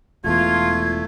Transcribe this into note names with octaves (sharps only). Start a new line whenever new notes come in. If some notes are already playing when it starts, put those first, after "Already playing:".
E1 E2 A3 F4 G#6